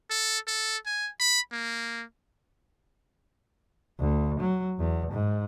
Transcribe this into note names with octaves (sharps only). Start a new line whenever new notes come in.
A4
A4
G#5
B5
A#3
D2
F#3
E2
G#2